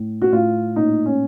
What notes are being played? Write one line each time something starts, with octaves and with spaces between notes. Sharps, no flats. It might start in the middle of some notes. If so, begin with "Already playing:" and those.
Already playing: A2
F#4
A2 F4
A#2 D#4
C#4